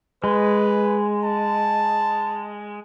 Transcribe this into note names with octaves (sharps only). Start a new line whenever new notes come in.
G#3 B4
A5